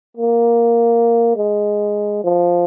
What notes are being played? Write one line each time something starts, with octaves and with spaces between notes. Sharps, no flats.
A#3
G#3
F3